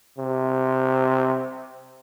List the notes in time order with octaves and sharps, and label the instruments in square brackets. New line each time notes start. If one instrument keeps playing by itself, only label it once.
[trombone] C3